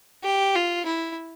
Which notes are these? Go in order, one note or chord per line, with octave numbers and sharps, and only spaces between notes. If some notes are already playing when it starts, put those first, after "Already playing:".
G4
F4
E4